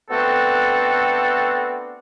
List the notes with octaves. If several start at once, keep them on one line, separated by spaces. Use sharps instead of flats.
A3 B3 C4 D4 F#4 A4